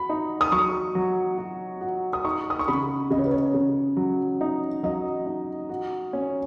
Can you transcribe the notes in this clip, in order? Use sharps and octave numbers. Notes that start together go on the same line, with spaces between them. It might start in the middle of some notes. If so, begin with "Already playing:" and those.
Already playing: F#4 B5
D#4
D#6
F#3 C#6
F#3
F#4
F#4
D#6
D#4 C#6
D#6
C#6
C#3 B5
C#3 D#5
C#5
B4
C#5
C#3
F#3
D#4
F#3 D#5
D#4
F#4
C#4